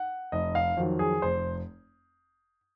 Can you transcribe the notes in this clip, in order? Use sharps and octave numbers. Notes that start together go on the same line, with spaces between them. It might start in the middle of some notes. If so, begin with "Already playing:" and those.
Already playing: F#5
F1 D#5
F5
F2 D#3 F#3
G#4
F1 C5